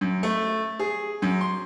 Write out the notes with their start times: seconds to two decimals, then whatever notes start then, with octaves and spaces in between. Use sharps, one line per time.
0.01 F#2
0.23 A3
0.79 G#4
1.22 F#2
1.41 C6